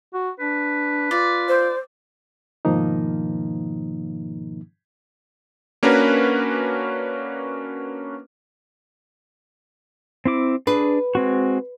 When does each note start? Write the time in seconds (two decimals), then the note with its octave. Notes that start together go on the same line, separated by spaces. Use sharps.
0.14 F#4
0.40 D4 B4
1.11 F4 D5
1.48 C5
2.65 G#2 B2 D#3 F3 A#3 D#4
5.83 A#3 C#4 D4 F#4 A#4 B4
10.25 C4 E4 D6
10.67 D4 G#4 B4
11.15 G#3 C4 F#4